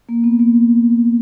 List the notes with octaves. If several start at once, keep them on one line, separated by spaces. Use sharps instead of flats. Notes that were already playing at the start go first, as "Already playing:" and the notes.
A#3
B3
A#3